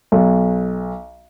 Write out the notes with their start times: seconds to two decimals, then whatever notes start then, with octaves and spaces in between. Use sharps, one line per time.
0.12 B1